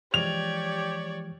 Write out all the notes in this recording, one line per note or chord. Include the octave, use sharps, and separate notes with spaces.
E3 F3 G#3 G4 C#5 D5 F7